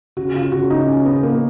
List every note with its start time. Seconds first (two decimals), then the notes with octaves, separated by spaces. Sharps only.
0.17 C#3 F#4
0.35 F4
0.52 C#3 F#4
0.70 D#4
0.88 C#4
1.05 B3
1.23 A#3